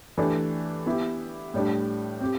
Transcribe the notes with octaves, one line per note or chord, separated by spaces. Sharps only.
E3 A3 D4 G4
B3 E4 G4
A2 G3 D4
C4 G4